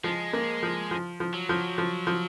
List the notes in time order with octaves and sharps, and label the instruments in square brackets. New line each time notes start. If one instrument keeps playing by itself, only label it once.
[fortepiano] F3 [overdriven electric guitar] G#3
[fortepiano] A#3
F3
F3
F3
[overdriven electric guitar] F#3
[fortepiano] F3
F3
F3